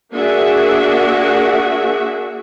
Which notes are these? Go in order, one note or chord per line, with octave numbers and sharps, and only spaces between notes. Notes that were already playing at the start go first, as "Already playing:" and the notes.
A#3 D4 F#4 G#4 E5